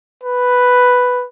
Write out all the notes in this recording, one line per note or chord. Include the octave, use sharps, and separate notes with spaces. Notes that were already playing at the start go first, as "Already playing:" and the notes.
B4